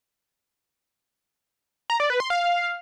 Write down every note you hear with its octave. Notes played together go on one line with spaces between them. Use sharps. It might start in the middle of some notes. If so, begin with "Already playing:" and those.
A#5
D5
B4
C6
F5